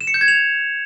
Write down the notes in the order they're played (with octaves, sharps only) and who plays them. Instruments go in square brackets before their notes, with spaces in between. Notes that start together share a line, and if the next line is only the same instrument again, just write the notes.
[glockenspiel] E7
C#7
G6
G#6
F7